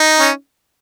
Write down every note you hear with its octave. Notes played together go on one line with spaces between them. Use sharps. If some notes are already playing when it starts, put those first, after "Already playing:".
Already playing: D#4
C#4